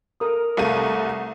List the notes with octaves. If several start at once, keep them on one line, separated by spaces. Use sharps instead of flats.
A4 A#4 D#6
C2 A3 F5 D#7